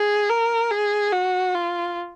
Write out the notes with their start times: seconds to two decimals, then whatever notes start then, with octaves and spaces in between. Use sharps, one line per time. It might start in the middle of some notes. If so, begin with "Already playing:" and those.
Already playing: G#4
0.30 A#4
0.71 G#4
1.12 F#4
1.54 F4